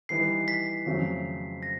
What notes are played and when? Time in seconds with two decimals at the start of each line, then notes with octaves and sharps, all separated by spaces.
0.09 E3 G3 B3 D#4 C7
0.48 B6
0.86 F2 C#3 F#3 A3
1.63 A#6